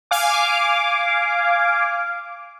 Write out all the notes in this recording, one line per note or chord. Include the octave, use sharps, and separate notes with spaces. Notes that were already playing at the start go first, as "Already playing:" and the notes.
F5 G#5 D6